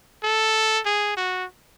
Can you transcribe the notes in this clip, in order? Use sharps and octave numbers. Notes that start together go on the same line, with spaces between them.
A4
G#4
F#4